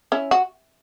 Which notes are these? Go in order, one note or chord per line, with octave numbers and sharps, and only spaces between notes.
C#4 E4
F#4